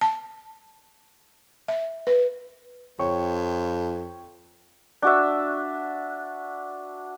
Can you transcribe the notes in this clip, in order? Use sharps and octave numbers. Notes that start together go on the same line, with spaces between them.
A5
E5
B4
F2 C#5 G5 C#6
D4 F#4 E5